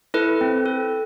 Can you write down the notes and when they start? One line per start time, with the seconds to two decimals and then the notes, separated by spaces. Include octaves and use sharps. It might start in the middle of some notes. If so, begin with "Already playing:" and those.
0.14 E4 A4 B4
0.41 C4
0.66 A4